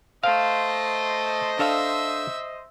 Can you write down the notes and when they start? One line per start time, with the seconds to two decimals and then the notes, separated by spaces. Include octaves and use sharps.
0.24 A3 C5 D#5 F5
1.59 D4 A4 E5 F5